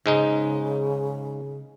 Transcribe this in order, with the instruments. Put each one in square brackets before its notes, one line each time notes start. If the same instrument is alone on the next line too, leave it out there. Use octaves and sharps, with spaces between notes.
[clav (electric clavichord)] G#2 G#3 D#4 [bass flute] C#3